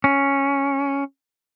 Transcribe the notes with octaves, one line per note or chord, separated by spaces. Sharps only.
C#4